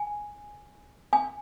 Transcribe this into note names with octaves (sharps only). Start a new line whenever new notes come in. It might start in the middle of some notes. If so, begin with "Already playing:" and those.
Already playing: G#5
G#5